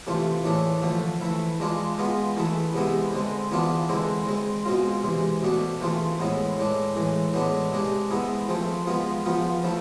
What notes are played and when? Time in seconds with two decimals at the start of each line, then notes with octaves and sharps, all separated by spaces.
0.07 C3 E3 A3 C4 F4
0.44 A2 E3 A3 D4 G#4
0.82 D3 F3 A3
1.21 E3 A3 E4
1.60 G#3 D4 F4 G#4
1.98 G#3 B3 F4 G#4
2.37 E3 A3 E4 G#4
2.74 C3 G#3 B3 E4 G#4
3.12 D3 G#3 C4
3.51 E3 B3 D4 F4 G#4
3.89 D3 G#3 C4 E4 G#4
4.27 G#3 C4 G#4
4.65 B2 G#3 C4 F4
5.04 C3 E3 G#3
5.43 B2 A3 D4
5.81 E3 A3 C4 F4 G#4
6.20 A2 G#3 B3 E4 G#4
6.57 A2 G#3 D4
6.95 A2 E3 G#3
7.33 A2 G#3 B3 D4 G#4
7.72 C3 G#3 D4 G#4
8.11 G#3 B3 E4 G#4
8.48 F3 A3 C4 G#4
8.87 G#3 B3 F4 G#4
9.26 F3 B3 F4 G#4
9.63 F3 A3 E4